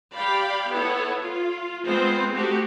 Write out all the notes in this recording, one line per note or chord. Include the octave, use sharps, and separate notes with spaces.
G4 D5 F5 G5 B5
B3 E4 A4 C#5
F4
G#3 B3 C4 F4 C5
A3 C4 D#4 F#4 G4